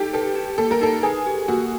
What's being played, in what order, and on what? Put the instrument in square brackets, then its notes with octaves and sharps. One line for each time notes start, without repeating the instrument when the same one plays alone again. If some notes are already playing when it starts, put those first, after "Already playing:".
Already playing: [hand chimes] D#4 [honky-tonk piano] G4 A4
[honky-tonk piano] A4 [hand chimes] B4
[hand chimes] G4
[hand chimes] A#3 [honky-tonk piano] A4
[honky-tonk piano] A#4
[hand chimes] D#4 [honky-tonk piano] A4
[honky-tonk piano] G#4 [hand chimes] B4
[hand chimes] G4
[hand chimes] A#3 [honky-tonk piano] F#4